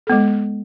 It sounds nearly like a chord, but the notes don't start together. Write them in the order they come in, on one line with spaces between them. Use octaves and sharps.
A4 B3 G#3